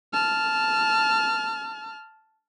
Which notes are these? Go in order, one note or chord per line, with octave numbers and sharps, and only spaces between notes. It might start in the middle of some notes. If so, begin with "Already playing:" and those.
A5 F6